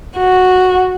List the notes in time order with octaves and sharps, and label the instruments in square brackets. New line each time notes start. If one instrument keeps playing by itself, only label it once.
[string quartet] F#4